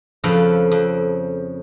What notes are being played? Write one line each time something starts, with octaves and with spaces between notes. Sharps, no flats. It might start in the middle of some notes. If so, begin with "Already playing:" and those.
F2 C#3 F3 A4 B4 F5
F2